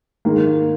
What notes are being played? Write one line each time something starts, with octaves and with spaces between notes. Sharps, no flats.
G#2 D#3 A#3